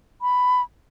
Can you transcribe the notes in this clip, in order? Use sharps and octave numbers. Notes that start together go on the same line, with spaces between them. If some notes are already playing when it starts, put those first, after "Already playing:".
B5